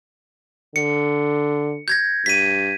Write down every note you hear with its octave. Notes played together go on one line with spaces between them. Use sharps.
D3 C#7
G6 G#6 A#6
G2 B6 D#7